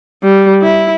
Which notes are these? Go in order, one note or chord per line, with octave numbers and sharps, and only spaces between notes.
G3
E4